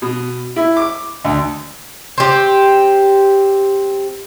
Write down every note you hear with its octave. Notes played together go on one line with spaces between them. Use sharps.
B2
E4
D6
D2
C4 G4